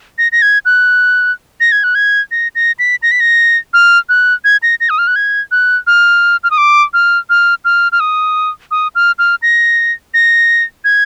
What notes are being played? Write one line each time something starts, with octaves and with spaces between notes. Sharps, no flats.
A#6
A#6
G#6
F#6
A#6
G#6
F#6
G#6
A#6
A#6
B6
A#6
B6
A#6
F6
F#6
G#6
A#6
A#6
D#6
F6
F#6
G#6
F#6
F6
F6
D#6
D6
F6
F6
F6
F6
D#6
D#6
F6
F6
A#6
A#6
G#6